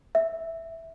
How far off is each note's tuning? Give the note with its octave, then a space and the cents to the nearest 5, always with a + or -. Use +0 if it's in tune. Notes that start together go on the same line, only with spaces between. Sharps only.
E5 +0